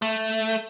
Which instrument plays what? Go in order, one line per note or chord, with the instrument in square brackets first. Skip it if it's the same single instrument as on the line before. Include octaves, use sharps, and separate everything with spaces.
[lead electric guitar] A3